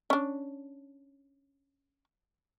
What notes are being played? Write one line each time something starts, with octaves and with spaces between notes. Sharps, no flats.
C#4 D4